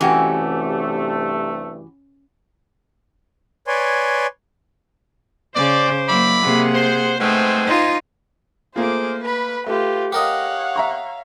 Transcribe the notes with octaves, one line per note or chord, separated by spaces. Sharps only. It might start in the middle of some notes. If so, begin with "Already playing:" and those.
G2 C3 E3 A3 C#4 F#4 G4
B4 C#5 D5 G#5 C6
C#3 C5 D5 D6
F#3 A#3 E4 D5 B5
C3 A#3 G#4 F#5
C5
G#2 A3 B3 C4 C5 G#5
D#4 F4
A3 A#3 F4 G#4 C5 D6
B4 B5
A3 F4 G4 B4
G4 A#4 C#5 D#5 F5 F#5
E5 A#5 C#6